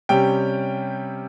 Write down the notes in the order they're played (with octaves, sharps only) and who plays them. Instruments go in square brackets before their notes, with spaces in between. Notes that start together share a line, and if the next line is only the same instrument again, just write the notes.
[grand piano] C3 G3 C#4 G5